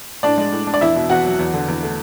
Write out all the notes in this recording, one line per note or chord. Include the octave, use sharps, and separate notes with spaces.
A2 D4 D5
G#3
A2
D4
D5
E2 E4 E5
B2
E2 F#4 F#5
F#3
E2
D3
E2
A3